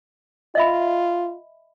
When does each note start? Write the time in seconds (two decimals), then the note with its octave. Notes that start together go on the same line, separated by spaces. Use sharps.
0.55 F4 D#5 E5 B5